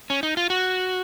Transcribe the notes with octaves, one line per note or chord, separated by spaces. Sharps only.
C#4
D#4
F4
F#4